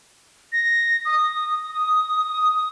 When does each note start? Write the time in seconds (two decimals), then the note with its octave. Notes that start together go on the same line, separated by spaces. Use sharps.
0.52 A#6
1.05 D#6
1.71 D#6